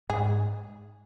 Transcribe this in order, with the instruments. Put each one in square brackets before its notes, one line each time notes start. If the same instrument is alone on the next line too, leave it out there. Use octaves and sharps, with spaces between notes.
[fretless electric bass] G#2 [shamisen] G#4